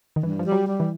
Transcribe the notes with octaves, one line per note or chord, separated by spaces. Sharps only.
D#3
G2 E3
F3
G3
F#3
G3
E3